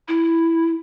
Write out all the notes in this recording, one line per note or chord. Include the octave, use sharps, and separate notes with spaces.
E4